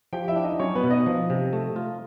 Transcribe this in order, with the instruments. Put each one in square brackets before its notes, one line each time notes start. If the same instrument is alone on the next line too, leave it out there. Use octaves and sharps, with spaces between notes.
[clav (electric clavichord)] F3 [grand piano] G4 G5
[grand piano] E4 E5
[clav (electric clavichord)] D4
[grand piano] D#4 D#5
[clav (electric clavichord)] F#3 [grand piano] C#4 C#5
[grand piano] B3 B4
[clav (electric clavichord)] B2
[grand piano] D#4 D#5
[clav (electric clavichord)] F3
C3
A3
F4